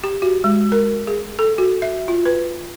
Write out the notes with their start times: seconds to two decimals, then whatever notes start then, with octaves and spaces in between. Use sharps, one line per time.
0.04 G4
0.22 F#4
0.44 G#3
0.72 A#4
1.07 G#4
1.39 A4
1.58 F#4
1.82 E5
2.08 F4
2.26 B4